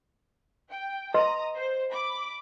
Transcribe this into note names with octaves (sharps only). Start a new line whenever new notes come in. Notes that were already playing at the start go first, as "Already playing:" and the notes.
G5
B4 D#5 A#5 C6 D#6
C5
B5 D6